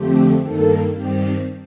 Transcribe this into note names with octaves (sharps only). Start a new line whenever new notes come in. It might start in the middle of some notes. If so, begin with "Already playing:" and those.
Already playing: F2 D3 F3 A3 C4 G4
G2 D#3 A#3 A4
G2 D#3 G3 C4 G4